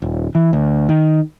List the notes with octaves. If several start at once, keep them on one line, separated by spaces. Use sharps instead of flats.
D#1
E3
D2
D#3